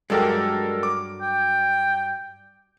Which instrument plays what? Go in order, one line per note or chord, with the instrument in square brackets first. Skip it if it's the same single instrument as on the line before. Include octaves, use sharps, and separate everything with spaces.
[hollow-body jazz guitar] G2 F#3 G4 [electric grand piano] G#3 A4 A#4
[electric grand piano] D6
[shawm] G5